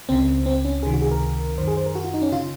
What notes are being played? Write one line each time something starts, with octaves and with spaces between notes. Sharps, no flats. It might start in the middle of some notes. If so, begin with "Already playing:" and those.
C#2 C#3 C4
C4
C#4
C#2 C3 D#3 G#4
F#4
G#4
A#4
F#2 D#3 C5
G#4
C5
A#4
F#4
F4
D#4
C#4
C#3 F4